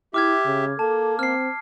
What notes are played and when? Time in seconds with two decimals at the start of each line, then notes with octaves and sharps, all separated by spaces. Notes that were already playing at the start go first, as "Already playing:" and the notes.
0.14 E4 G4 E5 D6 F6 G#6
0.46 C#3
0.79 A#3 A4 A5
1.19 C4 F6 C7